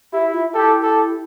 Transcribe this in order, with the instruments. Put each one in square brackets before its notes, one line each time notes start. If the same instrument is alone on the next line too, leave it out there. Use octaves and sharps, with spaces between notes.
[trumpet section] E4 [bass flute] G4
[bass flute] F4
[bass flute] E4 [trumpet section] G4 A4
[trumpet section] G4 A4